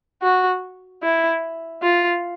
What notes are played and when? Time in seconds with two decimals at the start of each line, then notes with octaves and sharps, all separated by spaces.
0.22 F#4
1.03 E4
1.83 F4